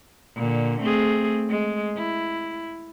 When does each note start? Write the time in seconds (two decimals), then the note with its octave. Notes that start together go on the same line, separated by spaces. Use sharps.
0.36 A#2 D3
0.82 A3 C4 G#4
1.50 G#3
1.97 E4